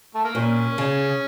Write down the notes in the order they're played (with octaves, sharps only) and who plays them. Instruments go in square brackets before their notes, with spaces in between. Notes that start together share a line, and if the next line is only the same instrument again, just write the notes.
[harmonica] A3
A#3
[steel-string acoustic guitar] A#2 [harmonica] C#4
[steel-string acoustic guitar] C#3